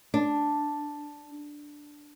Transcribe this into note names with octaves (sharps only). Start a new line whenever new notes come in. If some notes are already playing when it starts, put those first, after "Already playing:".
D4